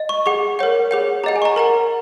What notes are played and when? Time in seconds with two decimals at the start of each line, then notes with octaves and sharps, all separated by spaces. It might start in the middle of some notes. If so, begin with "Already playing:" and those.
Already playing: D#5
0.09 C#6
0.26 G#4 F#5 C#6
0.59 A#4 C#5 F#5
0.91 G#4 C#5 F#5
1.24 G#4 D#5 F#5 A#5
1.36 G#5
1.42 C#6
1.45 A#5
1.56 A#4 F#5 A#5